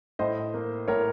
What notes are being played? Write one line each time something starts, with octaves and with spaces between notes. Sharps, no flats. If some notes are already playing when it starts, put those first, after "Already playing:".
A2 C5 D#5
A#3
A2 A#4 C#5